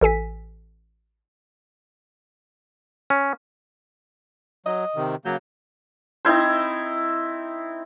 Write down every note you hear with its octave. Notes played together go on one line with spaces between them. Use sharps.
A1 A4 G#5 B6
C#4
F#3 D#5
C3 D#3
C#3 F#3 A#3 G6
C4 D#4 E4 C5